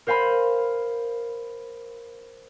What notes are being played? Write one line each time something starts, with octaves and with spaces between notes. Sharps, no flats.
A#4 C5 F5 G#5 B5